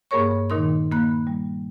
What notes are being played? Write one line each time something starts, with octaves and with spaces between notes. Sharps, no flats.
G2 A#3 G#4 A#4 C#5 C#6
A#2 D#3 D#4 A#4 C6
A#3 B5 F#6
G3